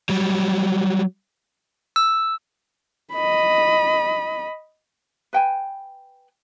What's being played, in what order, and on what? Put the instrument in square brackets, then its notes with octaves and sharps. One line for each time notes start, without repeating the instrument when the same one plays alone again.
[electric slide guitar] F#3 G3
[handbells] E6
[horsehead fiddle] D#5 B5
[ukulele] B4 G5 G#5